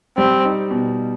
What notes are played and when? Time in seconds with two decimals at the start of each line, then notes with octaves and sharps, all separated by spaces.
0.17 G3 C4
0.45 D#4
0.71 B2